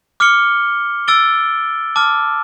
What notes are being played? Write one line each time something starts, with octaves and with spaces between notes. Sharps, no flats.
D6 F6 C#7 G7
E6 A6 D7 G7
A5 D6 F6